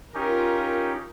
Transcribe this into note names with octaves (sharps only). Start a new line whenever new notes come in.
C#4 D#4 F4 G4 A#4